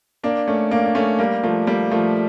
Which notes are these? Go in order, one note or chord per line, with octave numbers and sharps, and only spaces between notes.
A#3 D4
A3 C#4
A#3 D4
D4
A3 C#4
G3 A#3
F3 A3
G3 A#3
F3 A3